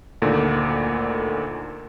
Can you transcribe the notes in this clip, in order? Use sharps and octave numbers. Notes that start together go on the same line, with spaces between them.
D2 A#2 D3 D#3